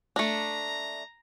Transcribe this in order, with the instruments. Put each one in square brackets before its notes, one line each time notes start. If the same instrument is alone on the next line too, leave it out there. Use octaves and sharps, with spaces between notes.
[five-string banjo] A3 D4 [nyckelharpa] A#5